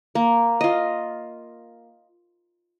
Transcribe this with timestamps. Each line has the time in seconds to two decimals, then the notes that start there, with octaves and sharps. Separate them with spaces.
0.15 A#3
0.61 F4 D#5